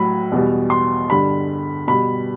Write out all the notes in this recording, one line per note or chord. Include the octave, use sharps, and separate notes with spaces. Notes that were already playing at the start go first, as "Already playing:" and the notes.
Already playing: A2 F#3 B5
E2 B2 G3
C6
G2 D3 G3 B5
B2 G3 B5